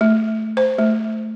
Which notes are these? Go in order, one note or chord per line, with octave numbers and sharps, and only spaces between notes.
A3
C5
A3